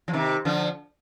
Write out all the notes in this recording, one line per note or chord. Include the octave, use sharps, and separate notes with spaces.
F3
C3 D#3
D3 F3